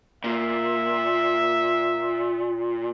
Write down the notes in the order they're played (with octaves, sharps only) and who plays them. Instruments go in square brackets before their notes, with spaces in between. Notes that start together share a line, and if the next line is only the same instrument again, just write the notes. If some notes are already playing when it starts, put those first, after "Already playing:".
[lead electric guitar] A#2 [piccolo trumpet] E5